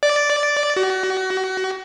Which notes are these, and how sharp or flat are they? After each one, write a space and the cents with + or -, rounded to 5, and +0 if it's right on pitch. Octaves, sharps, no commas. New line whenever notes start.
D5 -5
F#4 +30